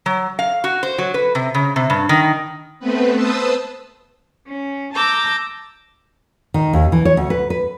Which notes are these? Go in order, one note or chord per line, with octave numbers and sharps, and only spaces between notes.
F#3
F5
F#4
C5
F#3
B4
C3
C#3
C3
G2
D#3
A3 B3 C4 B4
B4 C5 A5 D#6 E6
C#4
A5 A#5 D6 E6 G6
D#3
D#2
E3
C#5
D2
B4
B4